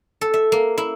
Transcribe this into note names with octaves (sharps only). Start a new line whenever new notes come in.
A4
E5
A#3
E4